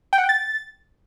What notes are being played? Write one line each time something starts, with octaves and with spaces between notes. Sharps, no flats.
G5
F#5
G5
A6